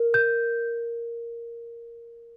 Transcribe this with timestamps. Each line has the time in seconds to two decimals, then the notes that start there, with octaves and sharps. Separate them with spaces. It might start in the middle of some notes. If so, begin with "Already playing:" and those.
Already playing: A#4
0.14 G6